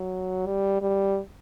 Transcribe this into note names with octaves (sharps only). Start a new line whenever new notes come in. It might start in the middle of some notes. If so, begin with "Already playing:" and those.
Already playing: F#3
G3
G3